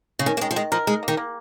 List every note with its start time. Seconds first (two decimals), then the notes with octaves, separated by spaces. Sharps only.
0.19 C#3
0.26 D#3 C#4
0.37 A#3
0.41 D#3 G#3
0.51 F3
0.56 D#3 G#3
0.72 F3 A#4
0.87 G#3 D#4
1.03 A#3
1.08 D#3
1.17 A#3